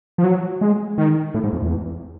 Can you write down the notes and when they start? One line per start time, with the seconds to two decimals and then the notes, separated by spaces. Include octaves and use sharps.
0.18 F3
0.24 F#3
0.61 G#3
0.98 D#3
1.34 A2
1.44 G#2
1.53 F2
1.62 E2